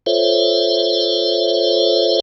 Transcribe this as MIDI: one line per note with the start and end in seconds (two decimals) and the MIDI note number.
0.06 2.20 65
0.06 2.20 69
0.06 2.20 72
0.06 2.20 73
0.06 2.20 76